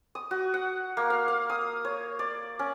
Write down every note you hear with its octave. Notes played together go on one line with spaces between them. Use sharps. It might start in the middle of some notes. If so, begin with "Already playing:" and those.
D#6
F#4
F#5
A#3
F5
F5
D#6
C#5
D5
C#4